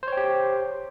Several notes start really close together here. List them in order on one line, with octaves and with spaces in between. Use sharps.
C5 C#5 G5 G4